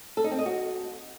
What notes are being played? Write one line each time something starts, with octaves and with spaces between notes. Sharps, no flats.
A4
D#4
C4
D#5
F#4